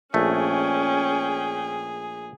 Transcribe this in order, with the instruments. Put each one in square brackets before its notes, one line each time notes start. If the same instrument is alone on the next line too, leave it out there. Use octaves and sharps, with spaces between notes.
[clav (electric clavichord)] A#1 A3 [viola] C#4 G5 [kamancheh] G#4